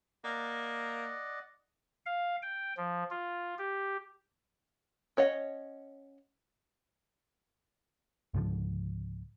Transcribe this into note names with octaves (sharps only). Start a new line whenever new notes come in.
A#3 D5 D#5 F#5
F5
G5
F3
F4
G4
C#4 C#5 D#5 F#5
C#2 G#2 D3 F3